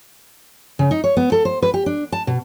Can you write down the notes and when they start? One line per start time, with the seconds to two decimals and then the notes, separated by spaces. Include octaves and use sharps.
0.79 C#3
0.91 D#4
1.04 C#5
1.17 B3
1.32 A4
1.45 C5
1.62 B4
1.74 G4
1.86 D4
2.12 A5
2.27 B2